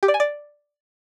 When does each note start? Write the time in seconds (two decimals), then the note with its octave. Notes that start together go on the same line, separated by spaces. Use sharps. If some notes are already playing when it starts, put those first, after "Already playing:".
0.03 G4
0.08 D5
0.14 G#5
0.20 D5